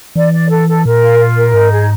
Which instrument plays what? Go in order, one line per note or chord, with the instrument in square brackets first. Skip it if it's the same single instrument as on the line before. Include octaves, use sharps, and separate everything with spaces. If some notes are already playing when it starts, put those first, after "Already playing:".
[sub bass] E3 [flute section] D5
[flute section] D5
A4
A4
[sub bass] A#2 [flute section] A#4
[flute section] F4
F4
A#4
[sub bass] G#2 [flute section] D#4
[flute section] G#4